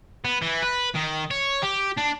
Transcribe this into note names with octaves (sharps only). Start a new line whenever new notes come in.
B3
E3
B4
D#3
C#5
G4
D4